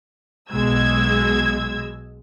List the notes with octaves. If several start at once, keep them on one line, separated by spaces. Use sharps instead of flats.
B1 B2 G#3 E6 G#6